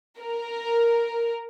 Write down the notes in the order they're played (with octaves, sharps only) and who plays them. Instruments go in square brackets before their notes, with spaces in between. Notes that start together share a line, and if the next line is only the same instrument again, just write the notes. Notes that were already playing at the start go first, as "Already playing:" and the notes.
[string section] A#4